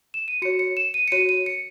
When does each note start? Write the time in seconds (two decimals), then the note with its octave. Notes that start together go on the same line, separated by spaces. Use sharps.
0.14 E7
0.28 D#7
0.42 F#4 C#5 C#7
0.59 C#7
0.77 E7
0.94 D#7
1.08 C#7
1.12 F#4 C#5 D#7
1.29 D#7
1.46 C#7